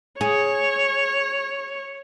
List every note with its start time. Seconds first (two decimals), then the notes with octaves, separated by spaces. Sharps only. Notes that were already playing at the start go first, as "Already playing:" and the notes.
0.21 G#4 C#5